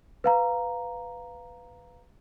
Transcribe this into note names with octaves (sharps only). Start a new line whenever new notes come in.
B4 F5 A#5